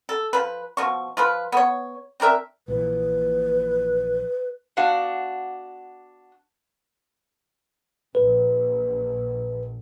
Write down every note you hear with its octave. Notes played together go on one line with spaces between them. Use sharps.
A4
F3 B4
B2 F3 C#6
F3 F4 B4
B3 C#5
C4 D4 A#4 E5
A#1 A#2 E3 B4
B3 D4 F#4 F5 F#5
A#1 B4